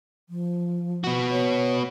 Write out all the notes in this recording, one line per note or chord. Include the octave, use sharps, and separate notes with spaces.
F3
B3 F#4
C#5